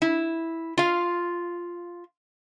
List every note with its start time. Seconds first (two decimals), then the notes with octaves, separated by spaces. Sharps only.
0.02 E4
0.77 F4 F5